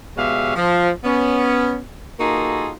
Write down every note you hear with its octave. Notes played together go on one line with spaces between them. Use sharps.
B2 G#3 G4 C#5 E5 F5
F3
B3 C#4
A#3 D#4 F4 F#4 G#4 A4